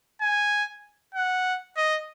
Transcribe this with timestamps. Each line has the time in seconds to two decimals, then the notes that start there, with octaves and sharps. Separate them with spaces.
0.21 G#5
1.14 F#5
1.77 D#5